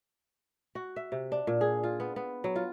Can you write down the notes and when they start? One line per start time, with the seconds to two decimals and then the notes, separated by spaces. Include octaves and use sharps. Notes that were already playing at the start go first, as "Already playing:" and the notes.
0.75 F#4
0.96 E5
1.12 C3
1.32 D4
1.47 A#2
1.61 G#4
1.83 F4
2.00 B3
2.16 B3
2.44 F#3
2.56 F4